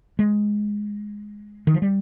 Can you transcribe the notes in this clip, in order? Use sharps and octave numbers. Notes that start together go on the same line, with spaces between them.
G#3
D#3
F3
G3